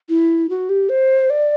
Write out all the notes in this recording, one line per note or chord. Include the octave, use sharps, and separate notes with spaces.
E4
F#4
G4
C5
D5